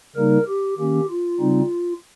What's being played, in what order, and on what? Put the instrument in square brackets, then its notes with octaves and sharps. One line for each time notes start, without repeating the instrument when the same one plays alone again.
[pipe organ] C#3 G3 A#3 D#4 A#4
G4
D#3 A#3 C#4 G4
F4
C#3 G3 C4 D#4